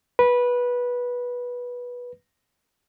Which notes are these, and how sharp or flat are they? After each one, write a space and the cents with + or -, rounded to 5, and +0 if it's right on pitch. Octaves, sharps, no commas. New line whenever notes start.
B4 -15